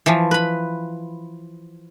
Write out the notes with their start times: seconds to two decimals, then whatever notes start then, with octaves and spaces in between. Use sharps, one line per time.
0.06 E3 F3
0.31 B4 B5